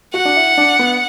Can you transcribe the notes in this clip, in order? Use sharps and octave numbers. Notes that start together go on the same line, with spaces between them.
F#4 F#5
D4
E4
D4
B3